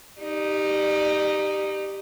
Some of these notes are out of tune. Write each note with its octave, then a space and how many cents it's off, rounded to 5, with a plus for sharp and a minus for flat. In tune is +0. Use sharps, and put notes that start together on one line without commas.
D#4 +0 G4 +0 D5 +40